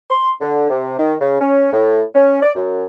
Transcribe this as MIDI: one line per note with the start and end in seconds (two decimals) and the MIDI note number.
0.10 0.30 84
0.41 0.68 50
0.70 0.97 48
0.99 1.15 51
1.21 1.37 49
1.41 1.72 61
1.73 2.03 45
2.15 2.39 61
2.42 2.51 74
2.55 2.86 42